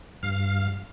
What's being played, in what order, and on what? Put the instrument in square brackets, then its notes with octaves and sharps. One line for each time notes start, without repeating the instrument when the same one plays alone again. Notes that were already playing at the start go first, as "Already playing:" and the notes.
[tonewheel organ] G2 F5